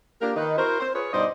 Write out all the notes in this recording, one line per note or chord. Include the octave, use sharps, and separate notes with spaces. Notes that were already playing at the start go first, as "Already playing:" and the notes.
A#3 D4 F4 G4 A#4
D#3 D#4 B4
E4 F#4 A#4 C5
C5
F4 G#4 B4 C#5
G2 B2 D#4 C5 D5 D#5